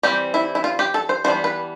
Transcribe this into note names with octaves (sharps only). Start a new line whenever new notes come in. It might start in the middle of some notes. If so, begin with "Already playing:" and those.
E3 G3 C4 G4
E4
E4
F4
G4
A4
C5
E3 G3 B3 D4 C5
B4